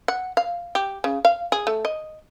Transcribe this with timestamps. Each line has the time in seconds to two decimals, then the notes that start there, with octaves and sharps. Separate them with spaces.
0.08 F#5
0.37 F5
0.75 G4
1.04 C#3
1.25 F5
1.52 G#4
1.67 A3
1.85 D#5